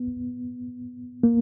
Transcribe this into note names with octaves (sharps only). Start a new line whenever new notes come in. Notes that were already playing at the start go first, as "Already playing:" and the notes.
Already playing: B3
A#3